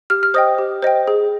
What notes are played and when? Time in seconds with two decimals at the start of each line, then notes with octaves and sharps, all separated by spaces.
0.10 G4 F6
0.23 F6
0.34 C5 D#5 G5 D#6
0.58 G4
0.82 C5 D#5 G5
1.07 G#4